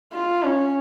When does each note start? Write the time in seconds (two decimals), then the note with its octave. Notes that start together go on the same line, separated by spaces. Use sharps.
0.13 F4
0.43 C#4